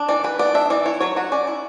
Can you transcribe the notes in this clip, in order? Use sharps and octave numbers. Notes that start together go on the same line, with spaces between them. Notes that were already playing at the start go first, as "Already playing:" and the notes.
Already playing: D4
E3 D5
E3 B4
B3 D5
D4 E5
E3 D5
E4 C#5
F#3 C#5
F#3 F#4
C#4 D5
E4